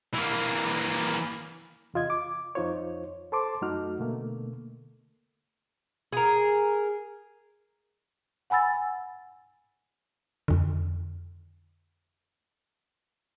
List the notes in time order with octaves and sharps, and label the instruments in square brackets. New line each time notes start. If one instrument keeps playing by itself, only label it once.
[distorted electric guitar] E3 A#3
[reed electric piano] E2 C3 F4 D#5 G#6
D6
F2 D#4 F4 C5 C#5
A4 C5 A5 C6 D6
F#2 A3 D#4 F#4 F6
B2 D3 A3 A#3
[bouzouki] G#4 A#4
[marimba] F#5 G#5 B5 E6 A6
[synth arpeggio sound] F2 D3